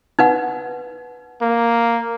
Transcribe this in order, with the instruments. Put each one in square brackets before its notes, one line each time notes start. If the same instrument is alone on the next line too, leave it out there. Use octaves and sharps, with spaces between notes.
[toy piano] D#4 B4 F#5
[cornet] A#3